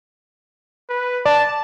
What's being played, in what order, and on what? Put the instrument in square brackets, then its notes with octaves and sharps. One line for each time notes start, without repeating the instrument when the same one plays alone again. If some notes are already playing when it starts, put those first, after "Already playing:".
[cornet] B4
[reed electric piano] D5 [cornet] A5